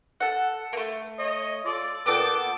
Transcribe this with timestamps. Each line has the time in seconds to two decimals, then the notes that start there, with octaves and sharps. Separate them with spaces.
0.21 A4 F#5
0.73 A3 A#3
1.18 C#5 D#5
1.65 F4 A4 D5
2.06 A#2 B3 A4 G5 D6